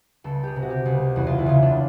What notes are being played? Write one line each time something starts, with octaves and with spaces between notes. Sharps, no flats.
C#2 A4
G4 G#4
C3
F#4
G4
C#2
E2 F#4
F4
E4
C#3 F4
D4